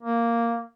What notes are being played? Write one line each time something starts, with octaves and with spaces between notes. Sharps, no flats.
A#3